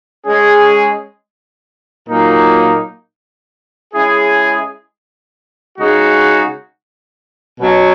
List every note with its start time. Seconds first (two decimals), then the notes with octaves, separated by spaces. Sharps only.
0.25 G#3 C#4 G#4
2.09 A#2 F#3 A#3 D#4
3.93 G#3 C#4 E4 G#4
5.77 C#3 G#3 D#4 F#4
7.61 B2 F#3 C#4